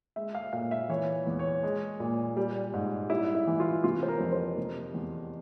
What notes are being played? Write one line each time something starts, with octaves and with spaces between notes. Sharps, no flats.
G#3 E5
F5
A#2 F5
E5
E3 C#5
E2
C#5
G#3
A#2
G3
G#2
G3 E4
E4
E3
F4
C3 F4
C5
A#4
F2
C5
C3
E2